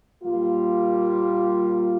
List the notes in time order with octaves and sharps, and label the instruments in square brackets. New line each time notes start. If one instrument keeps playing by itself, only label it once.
[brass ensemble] A#2 G3 A#3 F4